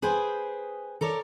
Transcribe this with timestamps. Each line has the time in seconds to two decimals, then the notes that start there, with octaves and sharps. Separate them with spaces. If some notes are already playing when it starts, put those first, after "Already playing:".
0.02 G#4 B4 C5 G5 G#5
1.01 A4 A#4 C#5 D5